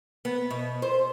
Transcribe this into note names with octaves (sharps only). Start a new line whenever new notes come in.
B3
B2
C5